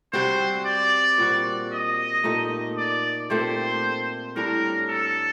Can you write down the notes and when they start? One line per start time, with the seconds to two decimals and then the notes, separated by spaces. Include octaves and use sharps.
0.13 C3 G3 C4 F#4 C5
0.66 D5
1.18 A#2 G3 C4 F#4
1.72 D#5
2.24 A#2 A3 D#4 G4
2.77 D5
3.30 A#2 A3 C4 G4 C5
4.36 A2 G3 D4 A#4
4.90 A4